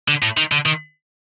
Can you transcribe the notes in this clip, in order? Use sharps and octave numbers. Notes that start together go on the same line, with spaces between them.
D3
A2
D#3
D3
D#3